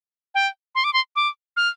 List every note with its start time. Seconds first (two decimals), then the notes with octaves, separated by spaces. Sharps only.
0.34 G5
0.75 C6
0.84 D6
0.93 C6
1.16 D6
1.57 F6